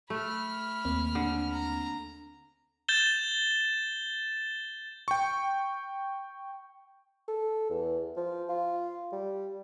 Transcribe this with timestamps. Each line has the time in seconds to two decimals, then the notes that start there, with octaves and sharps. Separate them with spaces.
0.10 A3 B5 F6
0.85 D#2 A#3 C4
1.15 D3
1.52 A#5
2.88 G6 A6 E7 G7
5.08 G5 C#6
7.28 A4
7.70 E2
8.16 F3
8.49 F4
9.12 G3